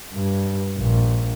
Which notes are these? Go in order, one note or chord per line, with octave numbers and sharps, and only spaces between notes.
G2
A#1